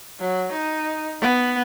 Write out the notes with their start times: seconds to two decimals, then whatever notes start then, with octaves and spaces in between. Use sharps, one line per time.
0.20 F#3
0.52 D#4
1.21 B3